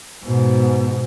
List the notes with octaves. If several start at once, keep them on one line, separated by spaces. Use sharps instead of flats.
G#2 B2